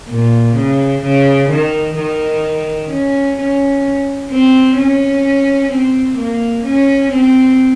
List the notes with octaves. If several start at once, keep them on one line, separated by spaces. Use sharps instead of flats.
A#2
C#3
C#3
D#3
D#3
C#4
C#4
C4
C#4
C4
A#3
C#4
C4